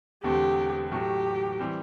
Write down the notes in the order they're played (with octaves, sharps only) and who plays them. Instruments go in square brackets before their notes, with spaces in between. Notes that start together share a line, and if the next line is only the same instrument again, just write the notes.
[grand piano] E1 E2 D3 A3 C4 [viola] G4
[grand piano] A2 F#3 A3 [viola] G4
[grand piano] E3 G3 C4